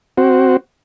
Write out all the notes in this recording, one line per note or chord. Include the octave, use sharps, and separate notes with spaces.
C4 F#4